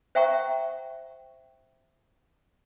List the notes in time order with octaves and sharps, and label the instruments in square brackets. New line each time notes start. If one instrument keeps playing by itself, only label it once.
[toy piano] C5 E5 F#5 G5 A#5 C#6